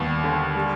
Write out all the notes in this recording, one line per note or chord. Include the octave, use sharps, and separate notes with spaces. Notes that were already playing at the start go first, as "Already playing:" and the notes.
Already playing: D#2 G3 B3
D3
G3